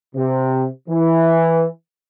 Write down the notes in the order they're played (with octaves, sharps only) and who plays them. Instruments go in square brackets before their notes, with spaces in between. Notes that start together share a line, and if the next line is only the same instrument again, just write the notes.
[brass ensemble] C3
E3